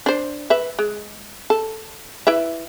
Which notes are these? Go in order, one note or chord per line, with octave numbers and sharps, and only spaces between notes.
D4 C5
B4 E5
G#3
A4
E4 B4 E5